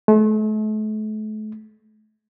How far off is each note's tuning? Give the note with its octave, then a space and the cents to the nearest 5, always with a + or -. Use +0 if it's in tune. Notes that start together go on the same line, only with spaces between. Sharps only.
A3 -40